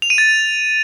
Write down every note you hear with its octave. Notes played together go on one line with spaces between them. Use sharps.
F7
D#7
A6